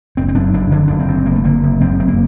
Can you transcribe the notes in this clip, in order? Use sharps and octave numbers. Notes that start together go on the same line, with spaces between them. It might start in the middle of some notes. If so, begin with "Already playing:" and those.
F#1 C4
C4
F#2 D4
F#1 D4
D3 D4
F#1 D4
C4
F#2
F#1 A#3
A3
D3 A#3
F#1
F#2 C4
F#1 C4
A#3